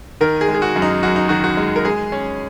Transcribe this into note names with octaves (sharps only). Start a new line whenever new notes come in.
D#3 A#4
G#4
G#3
G#4
F#4
F#2
D#4
F#2 F#4
D#4
D#3 F#4
F#4
G#3
A#4
G#3 G#4
C#4